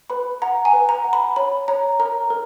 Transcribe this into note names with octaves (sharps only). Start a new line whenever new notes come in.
B4 B5
F#5 A#5
G#5
B4
A#5
F#5
B5
C#5 B5
C#5 A#5
A#4 A#5
A#4